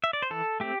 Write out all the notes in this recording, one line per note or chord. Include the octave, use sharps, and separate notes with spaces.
E5
D5
C5
E3 A4
A3 C4 G4